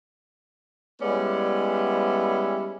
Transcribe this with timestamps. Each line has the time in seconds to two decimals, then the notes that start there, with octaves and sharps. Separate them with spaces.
1.02 G3 G#3 B3 C#4 E4 D5